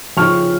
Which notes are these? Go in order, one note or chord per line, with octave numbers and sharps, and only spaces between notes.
F2 C#3 F3 C#6 F6